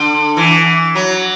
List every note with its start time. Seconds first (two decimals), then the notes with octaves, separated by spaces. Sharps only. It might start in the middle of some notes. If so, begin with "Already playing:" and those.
Already playing: D3
0.37 E3
0.95 F#3